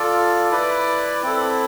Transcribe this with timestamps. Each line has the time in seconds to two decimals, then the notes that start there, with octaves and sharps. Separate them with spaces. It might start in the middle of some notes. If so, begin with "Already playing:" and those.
Already playing: F4 A4 D5
0.51 E4 B4 D5
1.23 C4 E4 A4